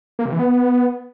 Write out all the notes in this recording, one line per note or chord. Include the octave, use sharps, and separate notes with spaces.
A#3
C3
E3
B3